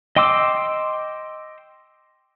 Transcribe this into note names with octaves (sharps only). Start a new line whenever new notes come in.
D#5 G5 C6 D6 E6